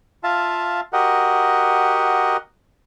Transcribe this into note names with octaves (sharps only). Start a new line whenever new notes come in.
F4 E5 F5 A5
F#4 G4 A#4 D#5 F#5